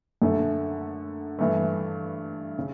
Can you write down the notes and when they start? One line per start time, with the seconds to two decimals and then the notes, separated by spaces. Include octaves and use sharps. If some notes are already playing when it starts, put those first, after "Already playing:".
0.22 F#2 D3 A3
1.39 G2 E3 A3
2.59 C#3